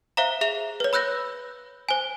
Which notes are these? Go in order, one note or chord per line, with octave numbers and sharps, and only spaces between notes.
C5 E5 F5 A#5
G#4 E5 F7
B4 C#5
B5 E6 F#6 G6 A#6
C5 G#5